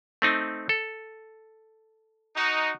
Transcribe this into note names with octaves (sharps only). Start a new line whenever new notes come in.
A3 C4 D#4
A4
D#4 F#4